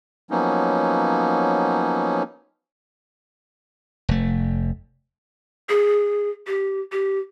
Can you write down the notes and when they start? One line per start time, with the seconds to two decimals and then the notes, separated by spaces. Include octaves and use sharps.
0.31 F3 F#3 A#3 B3 C#4 D#4
4.09 F1 A3
5.69 G#4
6.47 G4
6.92 G4